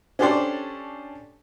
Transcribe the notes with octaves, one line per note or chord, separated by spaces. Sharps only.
C#4 D4 G4 A4 C5 D5